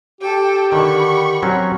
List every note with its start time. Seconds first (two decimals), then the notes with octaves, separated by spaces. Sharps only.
0.21 G4 A4 G5
0.72 D3 D#3 B5 C#6
1.43 F#3 C4 C#4